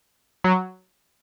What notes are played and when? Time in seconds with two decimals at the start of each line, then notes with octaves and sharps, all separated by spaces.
0.44 F#3